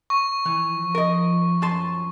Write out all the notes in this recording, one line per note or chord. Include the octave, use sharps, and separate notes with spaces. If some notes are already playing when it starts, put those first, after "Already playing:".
C#6
E3 F3
A#4 D#5
F#2 A5 C6